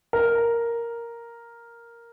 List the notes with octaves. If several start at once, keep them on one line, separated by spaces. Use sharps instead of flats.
A#4